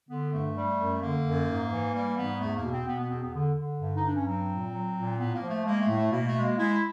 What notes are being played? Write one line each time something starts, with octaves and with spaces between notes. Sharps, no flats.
D3 B3
G2 A3
G3
F#2
D3 A#3
F#2
G#2
E3
G3 A#3
G#2 B3
E2 A3
A#3
B2
C4
B2 B3
B3
E2 C4
B3
D3
D3
G2
D#4
G2 D4
C#4
F#3 C4
A#2
F#3
A#2
A2 B3
A#3
F3
A3
G#3 A#3
A3
A2
A3
B2 A#3
A3
G#3
A#3
G#3 E4